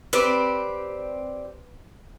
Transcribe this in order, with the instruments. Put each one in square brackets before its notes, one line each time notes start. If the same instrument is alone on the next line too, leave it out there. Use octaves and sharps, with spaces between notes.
[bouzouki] C4 G4 D5 [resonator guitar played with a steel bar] B4